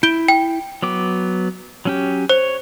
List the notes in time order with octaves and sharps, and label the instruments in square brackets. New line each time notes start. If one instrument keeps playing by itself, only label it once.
[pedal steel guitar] E4 [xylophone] G6 D7 G7
[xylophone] G5
[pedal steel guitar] F#3 B3 D6
F#3 C#4 G4
[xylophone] C5 [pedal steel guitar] C#5